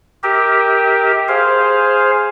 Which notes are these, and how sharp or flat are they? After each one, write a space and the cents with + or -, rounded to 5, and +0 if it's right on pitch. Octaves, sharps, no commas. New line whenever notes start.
G4 +0 A#4 +0 E5 -45
G#4 +0 C5 +0 F5 +0